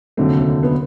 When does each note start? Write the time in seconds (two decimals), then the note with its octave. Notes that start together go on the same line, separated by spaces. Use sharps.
0.17 F1 D#2 D3 F#3 A3 C4
0.63 B3